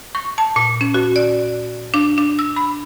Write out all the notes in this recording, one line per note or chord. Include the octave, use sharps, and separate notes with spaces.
C#6
A5
A#2
C#4
F#4
D5
D4
D4
E6
B5